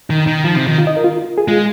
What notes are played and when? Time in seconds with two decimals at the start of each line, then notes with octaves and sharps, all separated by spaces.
0.09 D#3 D#4
0.27 D#3
0.44 F3
0.55 C3
0.68 D#3
0.78 F4
0.87 D#5
0.97 A#4
1.04 F4
1.38 G#4
1.48 G#3 F4